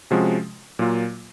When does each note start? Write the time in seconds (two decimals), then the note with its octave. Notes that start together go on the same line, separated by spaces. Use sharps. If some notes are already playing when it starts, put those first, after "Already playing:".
0.11 C3 F3 G#3 C#4 F#4
0.79 A#2 F#3 A#3 F4